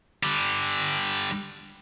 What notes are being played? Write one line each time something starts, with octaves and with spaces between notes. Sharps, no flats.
D3 G3